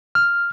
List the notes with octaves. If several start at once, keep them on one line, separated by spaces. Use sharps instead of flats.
F6